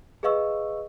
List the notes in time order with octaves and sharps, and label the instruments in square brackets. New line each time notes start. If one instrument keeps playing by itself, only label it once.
[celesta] G#4 B4 D#5 F5 C#6 E6